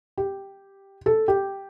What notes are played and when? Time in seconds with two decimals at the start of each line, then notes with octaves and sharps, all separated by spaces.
0.18 G4
1.06 A4
1.28 G4